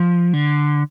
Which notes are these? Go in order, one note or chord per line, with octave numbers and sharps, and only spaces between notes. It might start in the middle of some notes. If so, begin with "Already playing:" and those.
Already playing: F3
D3